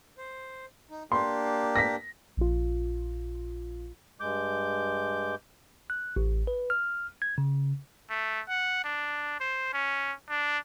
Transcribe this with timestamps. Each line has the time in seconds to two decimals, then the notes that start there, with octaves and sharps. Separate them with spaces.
0.18 C5
0.90 D#4
1.12 A#3 D4 G4 C6
1.76 A#6 B6
2.37 A#1 F4
4.20 G2 G#3 D6 G6
5.90 F#6
6.16 A1
6.47 B4
6.70 F6
7.22 G#6
7.38 C#3
8.10 A3
8.49 F#5
8.84 D4
9.40 C5
9.73 C#4
10.29 D4